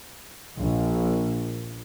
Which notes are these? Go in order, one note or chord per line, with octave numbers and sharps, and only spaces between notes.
A#1